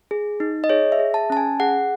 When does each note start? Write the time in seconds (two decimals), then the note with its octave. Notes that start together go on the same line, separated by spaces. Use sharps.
0.11 G#4
0.40 D#4
0.64 D#5
0.69 G#4 C#5
0.92 E5
0.99 G#4
1.14 A5
1.30 C#4 A5
1.37 G#5
1.60 G#4 F#5